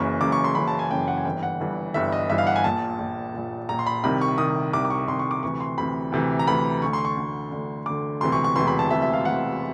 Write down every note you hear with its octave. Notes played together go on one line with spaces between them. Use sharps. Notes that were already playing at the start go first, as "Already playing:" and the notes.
Already playing: F#1 F#2 C#3 E3 C#6
F#1 F#2 C#3 E3 D6
C#6
C6
F#1 F#2 C#3 E3 B5
A5
G#5
F#1 F#2 C#3 E3 G5
F#5
G#5
G1 G2 E3 G5
F#5
G1 G2 E3
G1 G2 E3 E5
D#5
G1 G2 E3 E5
F5
F#5
G#5
A#1 A#2 A5
A#1 A#2
A#1 A#2
A#1 A#2 A#5
C6
B5
C2 C3 D#3 B5
C#6
C2 C3 D#3 D#6
C2 C3 D#3 D6
D6
C#6
C2 C3 D#3 C6
C#6
D6
D2 C3 E3 C#6
C6
D2 C3 E3 B5
D2 C3 E3
A#5
D2 C3 E3 B5
D2 D3 C#6
C6
C#6
D2 D3
D2 D3
D2 D3 D6
E1 D2 C3 E3 C6
C#6
C#6
E1 D2 C3 E3 C6
B5
A5
E1 D2 C3 E3 E5
E5
F5
E1 D2 C3 E3 F#5